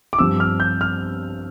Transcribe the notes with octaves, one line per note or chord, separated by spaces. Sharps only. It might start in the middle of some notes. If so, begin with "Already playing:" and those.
D6
G2 F3 C4 E6
F6
G6
F6